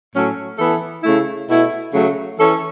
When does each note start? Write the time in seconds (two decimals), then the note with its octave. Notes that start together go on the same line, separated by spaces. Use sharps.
0.14 A2 F#3 C#4 A4
0.59 E3 B3 A4
1.04 C#3 A3 E4
1.48 B2 A3 E4
1.93 C#3 F#3 A3
2.38 E3 C#4 A4